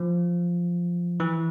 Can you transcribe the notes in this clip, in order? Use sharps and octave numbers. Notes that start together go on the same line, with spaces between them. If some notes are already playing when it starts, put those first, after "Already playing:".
Already playing: F3
E3